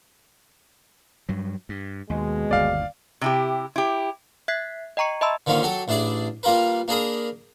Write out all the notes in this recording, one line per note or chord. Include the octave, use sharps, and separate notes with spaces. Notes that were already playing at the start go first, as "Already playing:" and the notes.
G2 F#3
G2
D#2 B2 G#3
G1 D#2 D5 F5
C3 E4 G4
E4 G4
E5 F#6 G#6 B6 C7
D#5 G5 A#5 C#6 C#7
D#5 E5 A5 B5 C6 E6
D3 D#3 F3 A#3 C#4
F#3 G4 A4
A1 D4 E4 G#4 D5
G3 A#3 F4 A#4 B4
A#3 D4 G#4 A#4 B5 D#6